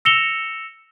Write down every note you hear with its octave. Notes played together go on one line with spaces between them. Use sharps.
E6 A#6 C#7 E7 F7 G7